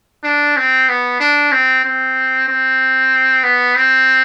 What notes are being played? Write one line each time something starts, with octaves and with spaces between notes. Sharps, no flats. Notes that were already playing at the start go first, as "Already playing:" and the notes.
D4
C4
B3
D4
C4
C4
C4
B3
C4